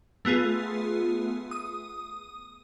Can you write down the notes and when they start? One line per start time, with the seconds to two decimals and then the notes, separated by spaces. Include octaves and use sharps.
0.25 A3 B3 F4 G#4
1.51 D#6